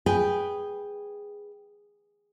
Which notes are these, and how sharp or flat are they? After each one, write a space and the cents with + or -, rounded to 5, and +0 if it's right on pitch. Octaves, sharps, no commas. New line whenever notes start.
G#4 -10 B4 +0 G5 +0